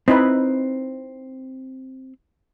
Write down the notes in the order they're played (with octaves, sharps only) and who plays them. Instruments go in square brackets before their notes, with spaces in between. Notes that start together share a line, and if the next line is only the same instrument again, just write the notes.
[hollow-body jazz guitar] C4 [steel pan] D#4 E4 B4